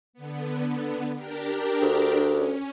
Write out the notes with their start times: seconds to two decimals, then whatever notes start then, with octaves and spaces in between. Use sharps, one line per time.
0.13 D3 B3
1.16 D4 G4 A#4
1.82 D2
2.29 C#4